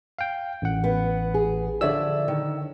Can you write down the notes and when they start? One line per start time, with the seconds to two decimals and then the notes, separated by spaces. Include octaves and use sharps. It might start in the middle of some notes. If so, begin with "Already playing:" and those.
0.19 F5 G5
0.62 A1 F#5
0.84 B3
1.34 G#4
1.81 D3 F3 C#5 D5 E5 E6
2.28 D#3